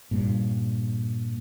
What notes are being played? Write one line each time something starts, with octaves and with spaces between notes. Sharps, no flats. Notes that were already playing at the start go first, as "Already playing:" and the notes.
G2 A#2